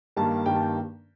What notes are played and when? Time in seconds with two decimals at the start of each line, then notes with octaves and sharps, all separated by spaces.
0.16 G2 D#3 G3 A#3 A5
0.46 G2 D#3 G3 A#3 G5
0.55 A5
0.63 G5